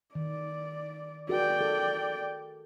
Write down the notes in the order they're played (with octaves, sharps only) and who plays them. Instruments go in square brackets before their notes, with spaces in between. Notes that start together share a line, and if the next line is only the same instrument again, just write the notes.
[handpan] D#3 [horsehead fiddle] D5
[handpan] F#4 G#4 A#4 [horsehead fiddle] D5 G5
[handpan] A4